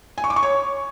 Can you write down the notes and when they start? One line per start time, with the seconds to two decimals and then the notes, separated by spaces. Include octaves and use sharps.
0.18 G#5
0.24 C#6
0.30 D6
0.36 C#6
0.43 C#5